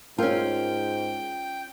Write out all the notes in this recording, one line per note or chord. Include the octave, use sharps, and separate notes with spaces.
G#2 C#4 F4 A#4 G5 A5